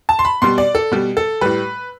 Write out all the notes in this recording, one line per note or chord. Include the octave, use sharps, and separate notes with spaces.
A5
C6
B5
B2 G3 C6
D5
A4
B2 G3
A4
A2 G3 B4